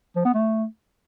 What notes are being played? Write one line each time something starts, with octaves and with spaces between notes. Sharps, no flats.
F3
B3
A3